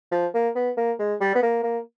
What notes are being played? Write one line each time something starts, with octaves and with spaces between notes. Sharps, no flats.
F3
A#3
B3
A#3
G#3
G3
B3
A#3
A#3